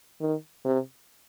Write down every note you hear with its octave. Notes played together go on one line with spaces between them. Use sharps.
D#3
C3